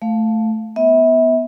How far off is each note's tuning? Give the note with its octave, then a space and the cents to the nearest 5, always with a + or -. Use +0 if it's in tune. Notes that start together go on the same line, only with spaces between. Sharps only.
A3 +0 F5 +0
B3 +0 E5 -30